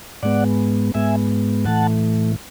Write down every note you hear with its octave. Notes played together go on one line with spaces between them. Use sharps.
G#2 G#3 B3 D5 F#5
G#2 G#3 B3 E5 G#5
A2 E3 A3 F#5 A5